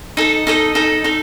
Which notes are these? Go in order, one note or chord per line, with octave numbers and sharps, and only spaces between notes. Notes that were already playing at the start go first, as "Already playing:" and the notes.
D#4 A4 D#5
D#4 A4 D#5
D#4 A4 D#5
D#4 A4